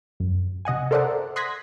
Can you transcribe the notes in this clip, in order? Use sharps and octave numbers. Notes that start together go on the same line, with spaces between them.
F#2
C3 D#5 F#5 G#5
A4 A#4 C5 D5 E5 F#5
C6 D#6 F#6 G#6 A#6 B6